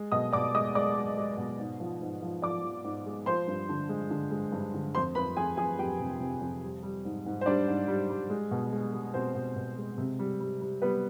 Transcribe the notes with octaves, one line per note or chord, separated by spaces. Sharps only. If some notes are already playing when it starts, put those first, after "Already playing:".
Already playing: G#3
B2 D#5 D#6
B2 D5 D6
G#3 D#5 D#6
G#3 D5 D6
G#3
G#3
B2
G#2
F3
G#2
F3
F3 D5 D6
F3
G#2
G#3
F3 C5 C6
G2
D3
G#3
D3
G#3
G2
D3
F2 C5 C6
F2 B4 B5
F2 G#4 G#5
F2 G#4 G#5
F2 G4 G5
C3
C3
F2
G3
G3
G#2
G#2
C5
G3 D4 D5
G#2
G3
G3
G#3
B2
G#3
G#3
B2 C4 C5
B2
B2
G#3
C3
G3
G3
G3
G3 B3 B4